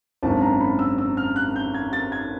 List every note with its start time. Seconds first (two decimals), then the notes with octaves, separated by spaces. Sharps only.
0.23 G#1 F#2 D3 A5
0.41 A#5
0.61 B5
0.79 E6
0.98 E6
1.17 F6
1.36 F#6
1.56 G6
1.74 G#6
1.93 A6
2.12 G#6